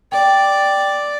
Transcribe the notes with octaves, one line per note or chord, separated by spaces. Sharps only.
D5 G5